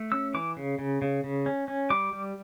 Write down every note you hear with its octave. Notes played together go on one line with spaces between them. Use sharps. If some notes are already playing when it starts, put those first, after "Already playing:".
Already playing: A3
C#4 E6
E3 D6
C#3
C#3
C#3
C#3
C#4
C#4
G3 D6
G3